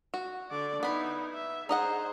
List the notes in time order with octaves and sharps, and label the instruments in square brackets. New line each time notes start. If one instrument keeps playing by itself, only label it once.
[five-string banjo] F#4
[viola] D3 D5
[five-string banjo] B3 B5 [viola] D#4 E4
[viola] E5
[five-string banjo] D#4 D#5 F#5 [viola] G#4 C5